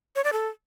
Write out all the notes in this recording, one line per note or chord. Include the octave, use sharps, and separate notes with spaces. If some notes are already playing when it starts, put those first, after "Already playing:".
C#5
D5
A4